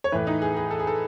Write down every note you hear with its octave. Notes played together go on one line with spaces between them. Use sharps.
C#5
A2 E3 B4
D#4
G#4
G#4
A4
G#4
A4